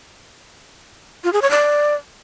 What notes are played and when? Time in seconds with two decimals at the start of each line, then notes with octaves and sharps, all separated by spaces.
1.24 F4
1.33 G#4
1.42 C#5
1.51 D5